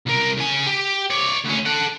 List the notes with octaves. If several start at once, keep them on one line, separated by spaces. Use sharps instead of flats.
C2 A#4
C#3 G#5
G4
C#5 D5
D2 C#4
A4 F#5